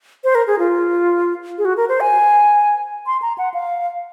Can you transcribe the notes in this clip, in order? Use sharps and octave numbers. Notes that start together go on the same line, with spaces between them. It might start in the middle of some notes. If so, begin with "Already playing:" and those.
C5
A#4
G#4
F4
G#4
F#4
A#4
C5
G#5
C6
A#5
F#5
F5